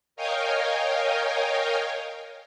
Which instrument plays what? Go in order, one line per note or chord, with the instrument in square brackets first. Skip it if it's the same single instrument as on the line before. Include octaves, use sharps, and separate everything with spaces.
[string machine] A#4 C#5 D#5 F5 G5 G#5